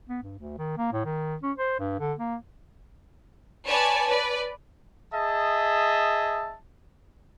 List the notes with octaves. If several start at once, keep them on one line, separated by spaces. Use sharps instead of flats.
B3
G2
D2
D#3
A#3
A2
D#3
C#4
C5
G2
D3
A#3
B4 C#5 D5 G#5 A5
B4 D5
G#4 D#5 E5 A5